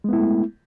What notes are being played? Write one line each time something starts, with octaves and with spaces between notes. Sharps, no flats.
G#3 A3 B3 E4